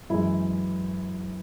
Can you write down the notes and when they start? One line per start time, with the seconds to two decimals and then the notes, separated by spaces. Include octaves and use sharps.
0.10 F#2 E3 G#3 E4